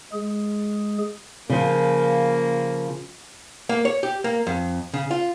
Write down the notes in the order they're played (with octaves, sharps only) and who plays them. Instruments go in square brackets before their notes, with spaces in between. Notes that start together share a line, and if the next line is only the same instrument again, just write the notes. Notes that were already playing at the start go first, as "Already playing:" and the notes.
[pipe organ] G#3 G#4
[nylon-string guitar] C#3 F3 [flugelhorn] A#3
[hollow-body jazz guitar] A#3
C#5
G4
A#3
F2
C#3
F4